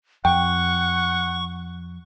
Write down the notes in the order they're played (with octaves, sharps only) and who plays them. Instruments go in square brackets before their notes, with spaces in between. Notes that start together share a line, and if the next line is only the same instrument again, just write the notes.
[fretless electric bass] F2 [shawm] F#5 [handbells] G5 [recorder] C#6